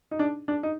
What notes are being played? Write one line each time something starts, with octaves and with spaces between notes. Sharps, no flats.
D#4
D4
D4
D#4